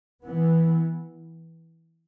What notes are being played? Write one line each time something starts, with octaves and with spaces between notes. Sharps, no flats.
E3 B3